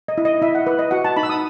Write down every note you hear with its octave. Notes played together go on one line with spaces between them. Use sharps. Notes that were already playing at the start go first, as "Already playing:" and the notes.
D#5
E4
D#5
E4 E5
F#5
B4
D#5
F#4 F#5
A5
D#4 B5
E6
D#6